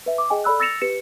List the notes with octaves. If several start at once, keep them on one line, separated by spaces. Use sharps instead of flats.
B4 E5
D6
G#4 D#5 G5 G#5
A4 D5 B5 E6 F#6
E6 A6 A#6 C#7 E7 F7
G4 B4 C#7 E7